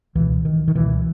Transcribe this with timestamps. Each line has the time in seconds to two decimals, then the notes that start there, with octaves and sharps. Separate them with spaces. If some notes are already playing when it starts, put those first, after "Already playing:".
0.15 C#2 B2 E3
0.45 D#3
0.68 D#3
0.75 C#2 B2 E3